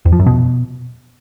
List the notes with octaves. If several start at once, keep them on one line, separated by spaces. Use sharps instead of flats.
E2
F3
F#2
B2